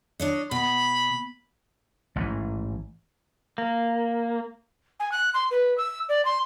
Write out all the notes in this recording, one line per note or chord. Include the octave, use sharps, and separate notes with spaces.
D4 C#5 D#5
B2 B5
A1 G#2 B2 E3
A#3
G#5
F#6
C6
B4
E6
D5
C6